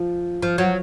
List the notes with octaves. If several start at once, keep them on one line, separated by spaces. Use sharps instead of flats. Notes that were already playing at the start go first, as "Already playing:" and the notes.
Already playing: F3
F3
F#3